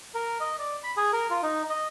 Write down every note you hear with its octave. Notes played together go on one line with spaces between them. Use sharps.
A#4
D#5
D5
B5
G#4
A#4
F4
D#4
D#5